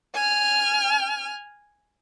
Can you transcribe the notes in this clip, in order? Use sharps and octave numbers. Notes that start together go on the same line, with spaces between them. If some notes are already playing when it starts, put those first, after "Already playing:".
G#5 F6